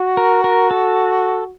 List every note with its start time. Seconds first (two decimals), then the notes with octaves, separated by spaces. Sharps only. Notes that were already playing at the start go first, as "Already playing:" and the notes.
Already playing: F#4
0.17 A#4
0.44 A#4
0.71 A4